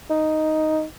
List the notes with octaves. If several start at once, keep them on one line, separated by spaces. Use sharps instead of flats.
D#4